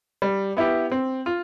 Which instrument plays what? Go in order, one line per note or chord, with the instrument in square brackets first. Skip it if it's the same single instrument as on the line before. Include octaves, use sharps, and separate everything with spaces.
[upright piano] G3
B3 E4 G4
C4
F4